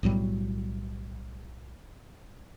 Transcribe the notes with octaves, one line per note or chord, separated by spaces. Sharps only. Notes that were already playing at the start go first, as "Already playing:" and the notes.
B1 A2 F#3 G3